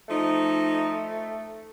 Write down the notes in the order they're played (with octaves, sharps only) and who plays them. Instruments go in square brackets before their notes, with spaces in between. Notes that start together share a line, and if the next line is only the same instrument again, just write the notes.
[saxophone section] F3 D#4 [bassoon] A3